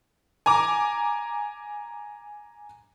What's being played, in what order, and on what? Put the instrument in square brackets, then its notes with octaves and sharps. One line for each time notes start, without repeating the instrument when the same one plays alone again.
[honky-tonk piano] G#5 A#5 D6